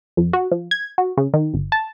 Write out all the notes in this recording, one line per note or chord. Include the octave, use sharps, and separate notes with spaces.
F2
F#4
F3
G#6
F#4
C#3
D#3
G1
A5